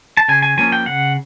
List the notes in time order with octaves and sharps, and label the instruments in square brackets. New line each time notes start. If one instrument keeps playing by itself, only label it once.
[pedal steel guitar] A5
C#3 G#5
G#5
F3 A#3 C#4 G#5
G5
C#3 F#5